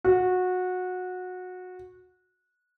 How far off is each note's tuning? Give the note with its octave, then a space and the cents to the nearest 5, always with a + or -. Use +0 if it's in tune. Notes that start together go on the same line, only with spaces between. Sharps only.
F#4 -20